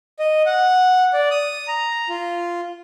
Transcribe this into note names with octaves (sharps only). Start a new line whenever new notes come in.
D#5
F#5
D5
D#6
A#5
F4